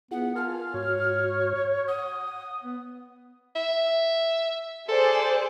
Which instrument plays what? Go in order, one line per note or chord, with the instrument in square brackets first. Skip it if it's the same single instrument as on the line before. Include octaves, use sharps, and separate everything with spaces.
[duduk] B3 [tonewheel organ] E4 F4 G#4 [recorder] F#5
[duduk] F4 [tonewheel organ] A#4 G#5 A5 [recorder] F6
[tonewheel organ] G#2 F#4 [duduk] C#5
[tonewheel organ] F#5 [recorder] D#6
[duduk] B3
[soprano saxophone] E5
[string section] G#4 C5 D5 [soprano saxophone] A4